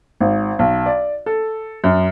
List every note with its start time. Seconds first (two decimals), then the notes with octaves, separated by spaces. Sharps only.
0.20 G#1
0.59 B1
0.86 D5
1.26 A4
1.84 F#2